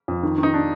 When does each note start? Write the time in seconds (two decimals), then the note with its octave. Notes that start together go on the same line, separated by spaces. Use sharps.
0.08 F2
0.23 D#3
0.38 D#3
0.43 D#4
0.54 D4